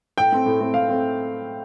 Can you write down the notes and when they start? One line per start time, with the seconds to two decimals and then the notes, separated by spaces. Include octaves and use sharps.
0.18 A2 G5
0.32 A3 C4
0.46 A2
0.60 A3 C4
0.74 A2 F5
0.89 A3 C4